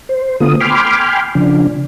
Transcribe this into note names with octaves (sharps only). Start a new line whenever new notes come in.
C5
D3 A3 B3 F4 D#6
G5 G#5 B5 C6 D6 F6
C#3 F3 D4